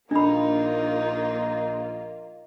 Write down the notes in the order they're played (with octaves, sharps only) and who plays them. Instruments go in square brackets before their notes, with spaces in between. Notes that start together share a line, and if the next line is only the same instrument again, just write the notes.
[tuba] A#1 [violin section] A#3 F4 [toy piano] D4 B5 [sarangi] D#4